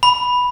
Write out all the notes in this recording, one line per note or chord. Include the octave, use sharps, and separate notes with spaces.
B5